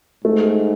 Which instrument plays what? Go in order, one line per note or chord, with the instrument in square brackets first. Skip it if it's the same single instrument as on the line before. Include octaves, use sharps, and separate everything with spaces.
[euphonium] G#2 [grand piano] A3